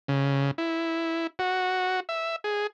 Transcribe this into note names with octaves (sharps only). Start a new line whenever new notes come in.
C#3
E4
F#4
E5
G#4